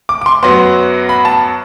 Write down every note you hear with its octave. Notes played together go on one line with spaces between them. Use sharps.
D6
D6
C6
F#2 F#3 B3 C6
B5
A5